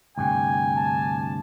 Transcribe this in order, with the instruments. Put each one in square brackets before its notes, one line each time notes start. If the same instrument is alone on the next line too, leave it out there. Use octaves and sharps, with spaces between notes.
[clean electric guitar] D2 G2 C3 [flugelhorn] G5 [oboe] G#5
[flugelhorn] A5